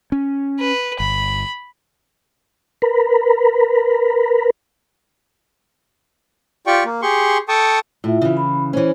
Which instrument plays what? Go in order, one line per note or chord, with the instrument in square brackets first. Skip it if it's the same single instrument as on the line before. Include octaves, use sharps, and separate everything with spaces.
[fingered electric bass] C#4
[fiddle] B4
[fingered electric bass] G1 [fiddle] B5
[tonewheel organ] A#4 B4
[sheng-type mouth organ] F4 G4 D5 G5 C#6
A#3
G4 G#4 C6 C#6
A4 G5 A5 C#6 D#6
[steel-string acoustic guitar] A2 [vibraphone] E4 F4 E5
[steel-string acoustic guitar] C#3 E3
[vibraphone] B5
[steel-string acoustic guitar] E3 C#4 [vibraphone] E4 C5